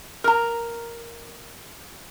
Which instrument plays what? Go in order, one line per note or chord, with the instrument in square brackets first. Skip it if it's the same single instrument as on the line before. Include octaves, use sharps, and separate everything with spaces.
[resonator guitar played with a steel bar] A#4 A#5